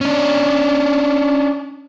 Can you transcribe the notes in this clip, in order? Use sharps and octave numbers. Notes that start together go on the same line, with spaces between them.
C#4 D4